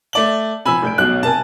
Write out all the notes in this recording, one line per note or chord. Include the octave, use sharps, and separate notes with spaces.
A3 D5 F#7
C3 F3 G#5 B5 E6
F1 G6 D7
B1 B2 F#6
C3 A#4 G#5 A5